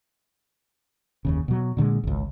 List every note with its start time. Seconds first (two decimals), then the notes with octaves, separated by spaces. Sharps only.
1.25 F#1 D#2 C#3
1.48 B2 F#3
1.77 A#2 D3 D#3 G#3
2.04 G#1 C#2